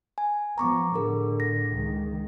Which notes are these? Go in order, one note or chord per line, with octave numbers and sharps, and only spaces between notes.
G#5
F3 B3 A#5 C#6 D6
A2 D3 G#4 A#4 D6
A#6
C#2 D#3